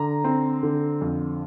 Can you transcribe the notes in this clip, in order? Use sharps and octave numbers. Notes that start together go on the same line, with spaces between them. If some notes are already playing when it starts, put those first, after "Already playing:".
Already playing: D3 A#5
C4
D3
F2